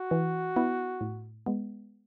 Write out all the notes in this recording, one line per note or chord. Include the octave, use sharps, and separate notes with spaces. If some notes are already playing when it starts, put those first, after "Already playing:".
Already playing: F#4
E3
B3 E4
A2
G#3 B3